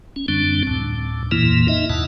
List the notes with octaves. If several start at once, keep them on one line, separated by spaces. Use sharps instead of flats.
C#4
F#2 D3 G3 C4 D4
D2 A2
F2 A#2 E3 A#3 E4
D#4 E4 D#5 E5
E2 G#2 B2 F#5 A5